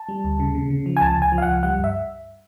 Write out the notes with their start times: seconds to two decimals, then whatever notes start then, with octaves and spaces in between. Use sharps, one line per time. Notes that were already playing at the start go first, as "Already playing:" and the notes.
Already playing: A5
0.09 G3
0.24 D2
0.40 C#3
0.55 C#3
0.70 C#3
0.86 F3
0.97 G#5
1.01 C#2 A5
1.17 C#2
1.22 G#5
1.32 F3
1.38 F5
1.42 C#2 F#5
1.63 G3 F#5
1.78 G2
1.84 E5